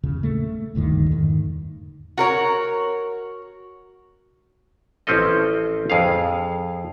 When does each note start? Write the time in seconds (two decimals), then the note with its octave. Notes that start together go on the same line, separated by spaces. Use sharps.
0.03 E2 A#2 C#3
0.23 A3
0.75 D#1 D2 G2 D#3
1.11 E2 G#2 D3 D#3
2.18 F#4 A#4 C#5
5.07 A1 F3 C4 C#4 A4 D#5
5.90 F2 G#4 F5